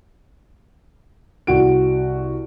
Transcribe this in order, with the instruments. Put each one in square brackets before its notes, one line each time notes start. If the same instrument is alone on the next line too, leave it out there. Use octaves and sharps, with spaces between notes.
[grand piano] C2 F#4 D7